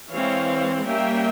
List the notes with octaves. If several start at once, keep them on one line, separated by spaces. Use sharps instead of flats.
E3 G#3 C4 C#5 F5
G3 A#3 C#4 E5 G5